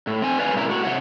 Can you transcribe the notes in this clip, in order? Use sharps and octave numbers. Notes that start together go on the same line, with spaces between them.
A2
C4 G#5
B4 C#5 D5 F5 F#5 G#5
G2 A#2 C#3 E4 A#4
A2 F#4
C3 D#3 C#5 F#5